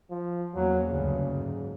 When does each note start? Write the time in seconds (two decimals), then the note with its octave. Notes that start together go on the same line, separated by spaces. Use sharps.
0.11 F3
0.55 E2 F#3 A#3 C#4
0.88 F#1 D2 G2 C#3
1.33 G#2